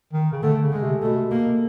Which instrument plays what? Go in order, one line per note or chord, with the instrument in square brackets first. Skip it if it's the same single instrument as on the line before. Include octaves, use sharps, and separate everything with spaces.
[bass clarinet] D#3
C#3
[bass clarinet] D3 [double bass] A3
[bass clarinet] C#3
[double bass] G#3
[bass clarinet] C3
[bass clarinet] B2 [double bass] A3
[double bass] A#3